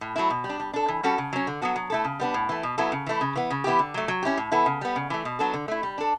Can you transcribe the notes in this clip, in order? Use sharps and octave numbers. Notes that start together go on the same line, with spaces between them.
A2
F#3 A3 E4
B2
G3
D4
G3
D4 A4
E3
G3 C#4 F#4 A4
C#3
F#3 C#4
D3
F#3 B3 F#4 A4
F#3
A3 E4 A4
C#3
G3 B3 D4
A2
E3 A3
B2
F#3 B3 E4 A4
C#3
E3 A3 E4
C#3
E3 B3
C#3
E3 B3 E4 G4
D3
F#3 A3
F#3
C#4 E4 G4
A2
E3 B3 E4 A4
C#3
G3 B3
C#3
E3 A3
B2
F#3 B3 D4 A4
D3
A3 E4
G3
D4 A4